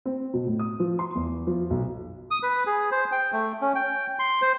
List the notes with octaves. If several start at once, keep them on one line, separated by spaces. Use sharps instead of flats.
C4
B2
A2
D#6
F3
C6
E2
F3
B1
D#6
B4
G#4
C5
G5
A3
C#4
G5
C6
C5